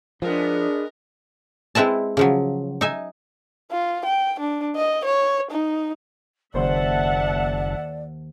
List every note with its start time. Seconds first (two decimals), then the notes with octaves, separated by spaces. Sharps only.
0.22 F3 G#3 B3 D4 A#4
1.75 G#3 C4 E4 B4 A5
2.17 C#3 F3 F#3
2.81 D#4 E5 G#5
3.71 F4
4.05 G5
4.40 D4
4.76 D#5
5.05 C#5
5.51 D#4
6.54 F#1 D#2 C5 D5 E5 F#5 A5 C6